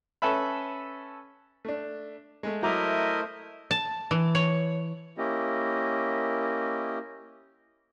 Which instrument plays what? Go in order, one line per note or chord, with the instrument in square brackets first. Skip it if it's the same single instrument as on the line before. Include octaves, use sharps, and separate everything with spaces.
[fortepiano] C#4 A4 B4 E5 B5
A3 D4
G#3 A3
[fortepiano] F#3 A#5 D6 [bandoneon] A3 C5 [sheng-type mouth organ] E4 A#4 D#5
[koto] A5
E3
C#5
[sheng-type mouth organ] A#3 C#4 E4 G4 D#5